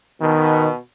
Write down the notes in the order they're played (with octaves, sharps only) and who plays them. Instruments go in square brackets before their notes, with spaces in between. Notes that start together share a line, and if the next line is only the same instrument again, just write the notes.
[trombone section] B2 [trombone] D#3